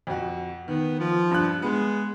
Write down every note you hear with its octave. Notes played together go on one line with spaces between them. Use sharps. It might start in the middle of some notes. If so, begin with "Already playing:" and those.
F2 F#4
D#3 B3
F3
G2 F#6
G#3 B3